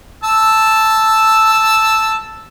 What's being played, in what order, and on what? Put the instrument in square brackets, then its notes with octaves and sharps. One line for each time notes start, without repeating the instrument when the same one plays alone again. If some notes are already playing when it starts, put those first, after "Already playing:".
[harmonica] A5 E6